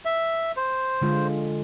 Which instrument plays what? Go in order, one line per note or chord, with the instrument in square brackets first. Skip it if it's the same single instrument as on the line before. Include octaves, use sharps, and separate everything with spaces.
[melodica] E5
C5
[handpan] D3 G#3 F4